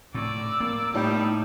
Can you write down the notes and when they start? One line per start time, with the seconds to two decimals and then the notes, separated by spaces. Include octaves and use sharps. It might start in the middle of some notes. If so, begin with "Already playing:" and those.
0.15 A2 D5 E6
0.60 A#3
0.95 A2 G3 D#4 A5